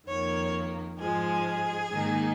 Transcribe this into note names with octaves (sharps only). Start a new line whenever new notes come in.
F2 D#3 A#3 C#5
G#2 F3 G#3 G#4
G#2 D#3 A#3 D#4